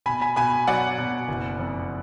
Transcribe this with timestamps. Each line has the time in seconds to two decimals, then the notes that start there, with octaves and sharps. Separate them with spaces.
0.06 B2 G#5 B5
0.21 G#5 B5
0.36 B2 G#5 B5
0.67 F#3 D5 F#5
0.98 B2
1.28 F#1
1.59 F2